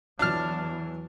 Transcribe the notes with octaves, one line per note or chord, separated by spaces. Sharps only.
E2 E3 F#3 D4 A5 F6